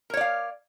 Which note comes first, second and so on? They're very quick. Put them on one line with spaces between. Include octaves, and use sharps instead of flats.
A#4 C#5 D5 F5